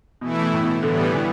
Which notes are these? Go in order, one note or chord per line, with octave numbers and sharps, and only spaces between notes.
B2 E3 A3 E4
B2
A2
B2
A2 D3 E3 G3 B3
E3